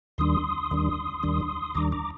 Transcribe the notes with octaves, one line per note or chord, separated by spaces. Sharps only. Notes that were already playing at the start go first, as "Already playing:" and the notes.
D#2 D#3 G3 D4 C6 D#6
D#2 D#3 G3 D4
D#2 D#3 G3 D4
D#2 D#3 G3 D4 A#5 D6
A#5 D6